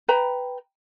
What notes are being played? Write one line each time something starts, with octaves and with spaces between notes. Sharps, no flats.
B4 G5 A#5 B5